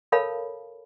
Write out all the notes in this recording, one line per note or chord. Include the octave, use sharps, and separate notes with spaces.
A4 A#4 C#5 F5 A5 B5